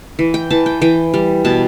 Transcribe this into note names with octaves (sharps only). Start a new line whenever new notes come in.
E3
G5
E3 A5
G5
E3 G5
G3
B2 A5